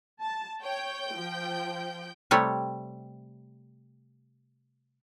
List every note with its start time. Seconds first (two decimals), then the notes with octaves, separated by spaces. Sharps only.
0.22 A5
0.62 C#5 G5 G6
1.14 F3
2.31 C3 G3 A3 C#5